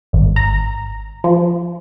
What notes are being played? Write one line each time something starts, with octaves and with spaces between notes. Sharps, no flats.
G#1
A#5
F3